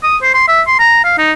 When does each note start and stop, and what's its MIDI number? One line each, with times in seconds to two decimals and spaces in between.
0.03 0.17 87
0.22 0.34 72
0.34 0.46 84
0.48 0.61 76
0.67 0.76 84
0.79 1.02 82
1.04 1.14 77
1.18 1.32 63